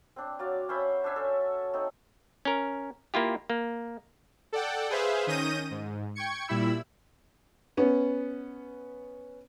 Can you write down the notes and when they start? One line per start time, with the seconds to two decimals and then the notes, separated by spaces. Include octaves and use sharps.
0.16 C4 D4
0.39 F#3 D5 F5
0.69 C#4 C5 E5 B5
1.04 D4 C5 E5 G#5
1.16 C#4 A4
1.73 A3 C4 D#4
2.45 C#4 A#4
3.14 A#3 E4 F4 G4
3.50 A#3
4.53 A4 D5 F#5 G5
4.90 G#4 B4 C5 E5 F5
5.27 D#3 C#4 D#6 G6 A#6 D#7
5.71 G#2
6.15 G5 C#6 G#6 C#7
6.48 A#2 G3 E4 B5 E6
7.77 B3 C#4